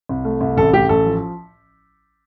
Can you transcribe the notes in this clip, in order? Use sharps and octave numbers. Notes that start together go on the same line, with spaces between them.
C2
A3
C2
A1 A4
A3 G4
A1 A4
F3